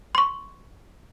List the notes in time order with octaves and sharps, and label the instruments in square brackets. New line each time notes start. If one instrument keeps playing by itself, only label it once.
[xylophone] C6 C#6